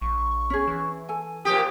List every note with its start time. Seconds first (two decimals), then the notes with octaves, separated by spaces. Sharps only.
0.02 A#1 C#6
0.50 C#4 G#4
0.68 E3
1.09 A4 G#5
1.45 A#2 F3 G4 D#6